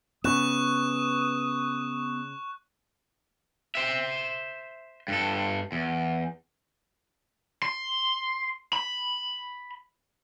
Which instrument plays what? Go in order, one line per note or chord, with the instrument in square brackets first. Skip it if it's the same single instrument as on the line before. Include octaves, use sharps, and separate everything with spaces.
[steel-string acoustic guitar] C#3 [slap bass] B3 [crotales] C#6 F#6 E7 [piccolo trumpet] D#6
[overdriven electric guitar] C5 E5
G2 A4
E2
C6
B5